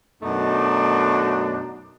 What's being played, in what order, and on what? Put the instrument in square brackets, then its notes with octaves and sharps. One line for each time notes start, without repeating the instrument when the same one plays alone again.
[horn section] F#2 B2 A3 D4 D#4